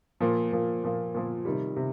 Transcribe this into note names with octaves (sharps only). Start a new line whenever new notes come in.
A#2 F3 A#3
A#2 F3 A#3
A#2 F3 A#3
A#2 F3 A#3
C3 D#3 G3
C3